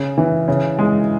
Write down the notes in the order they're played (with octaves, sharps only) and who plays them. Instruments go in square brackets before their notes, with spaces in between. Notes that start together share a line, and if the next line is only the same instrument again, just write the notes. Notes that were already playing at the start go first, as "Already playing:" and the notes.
Already playing: [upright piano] C#3
E3
C#3
G#3